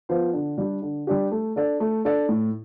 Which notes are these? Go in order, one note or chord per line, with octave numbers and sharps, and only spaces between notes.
F3 B3 F4 C5
D3
G3 D4 G4
D3
G3 D4 G4
A3
D4 A4 D5
A3
D4 A4 D5
A2